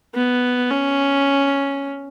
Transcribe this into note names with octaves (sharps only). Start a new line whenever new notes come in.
B3
C#4